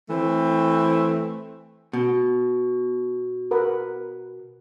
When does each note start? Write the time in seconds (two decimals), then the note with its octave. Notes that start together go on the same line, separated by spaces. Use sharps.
0.10 E3 A3 C4
1.93 B2
3.51 A#4 B4 F#5